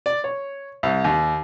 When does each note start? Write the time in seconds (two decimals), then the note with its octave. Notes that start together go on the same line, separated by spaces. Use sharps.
0.06 D5
0.24 C#5
0.83 C2
1.04 D#2